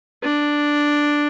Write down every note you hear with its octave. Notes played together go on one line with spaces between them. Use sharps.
D4